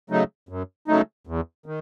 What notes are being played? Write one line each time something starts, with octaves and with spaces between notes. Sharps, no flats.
C#3 F#3 A3 D#4
F#2
C#3 F#3 A3 D#4
E2
D#3